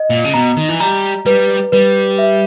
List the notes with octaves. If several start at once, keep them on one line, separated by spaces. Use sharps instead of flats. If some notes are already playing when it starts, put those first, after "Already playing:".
Already playing: D#5
A#2
C#3
B2 A#5
D#3
E3
G3 A#5
G3 B4
G3 B4
E5